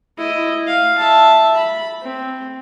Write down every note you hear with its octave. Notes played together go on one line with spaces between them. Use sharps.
E4 D#5
F5
E5 A5
B5
C4